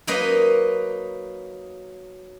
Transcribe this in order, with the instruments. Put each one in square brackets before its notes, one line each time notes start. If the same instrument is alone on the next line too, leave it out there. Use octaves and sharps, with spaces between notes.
[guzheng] F#3 A#3 D#4 B4 D#5